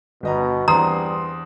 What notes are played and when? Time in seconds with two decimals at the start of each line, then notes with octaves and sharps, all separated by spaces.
0.23 G1 B2 D#5 A#5
0.68 E2 G2 C4 A#5 C6 D#6